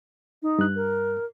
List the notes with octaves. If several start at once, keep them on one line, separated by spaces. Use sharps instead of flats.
D#4
G2 F#6
A#4